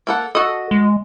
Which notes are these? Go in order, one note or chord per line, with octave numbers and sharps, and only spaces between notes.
A#3 A4 F#5
F#4 A4 D#5
G#3